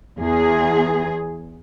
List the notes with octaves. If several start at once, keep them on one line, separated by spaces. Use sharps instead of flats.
E2 G#4